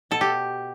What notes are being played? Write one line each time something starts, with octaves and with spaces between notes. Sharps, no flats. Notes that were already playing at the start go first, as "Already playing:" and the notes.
B2 A4
G4